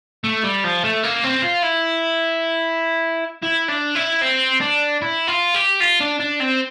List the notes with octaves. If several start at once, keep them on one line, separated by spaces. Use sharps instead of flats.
A3
G3
F3
A3
A#3
C4
F4
E4
E4
D4
E4
C4
D4
E4
F4
G4
F4
D4
D4
C4